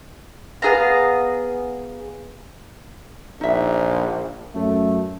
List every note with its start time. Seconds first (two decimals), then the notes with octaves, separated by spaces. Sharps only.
0.62 B3 G#4 F5 A#5
3.41 A#1 D#4 E5
4.55 F#2 A3